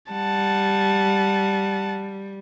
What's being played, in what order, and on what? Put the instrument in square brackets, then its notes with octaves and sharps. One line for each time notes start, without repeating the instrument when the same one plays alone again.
[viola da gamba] G3 [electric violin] F#5 A5